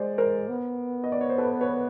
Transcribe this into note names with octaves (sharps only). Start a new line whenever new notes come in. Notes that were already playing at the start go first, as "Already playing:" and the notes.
Already playing: G#3 C5 D5
A#4 C5
B3
D#5
D5
C#5
C5
A4 B4
B4 C#5